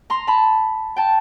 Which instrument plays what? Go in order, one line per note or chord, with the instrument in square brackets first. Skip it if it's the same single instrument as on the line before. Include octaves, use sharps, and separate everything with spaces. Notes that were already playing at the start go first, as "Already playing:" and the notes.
[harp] A#5 C6
A5 B5
G5 A5